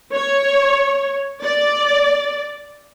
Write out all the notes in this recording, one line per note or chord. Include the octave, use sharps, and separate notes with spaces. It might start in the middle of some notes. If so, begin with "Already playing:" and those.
C#5
D5